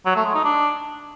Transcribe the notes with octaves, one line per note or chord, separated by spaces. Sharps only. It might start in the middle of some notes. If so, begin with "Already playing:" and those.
F#3
A3
G#3
D#4
D4